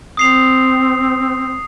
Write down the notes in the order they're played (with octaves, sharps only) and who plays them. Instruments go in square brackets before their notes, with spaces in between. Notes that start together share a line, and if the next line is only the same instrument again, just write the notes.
[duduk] C4 [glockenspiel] D#6 C7 F7